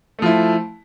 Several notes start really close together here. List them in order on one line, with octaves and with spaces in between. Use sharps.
A3 F3 E4